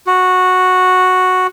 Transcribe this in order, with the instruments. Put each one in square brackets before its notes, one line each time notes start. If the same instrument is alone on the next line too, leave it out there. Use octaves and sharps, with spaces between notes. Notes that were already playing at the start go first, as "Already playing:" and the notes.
[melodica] F#4